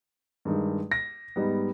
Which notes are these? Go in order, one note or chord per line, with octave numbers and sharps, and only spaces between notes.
G2 D#3 G#3 D#4
A#6
G#2 G3 B3 D#4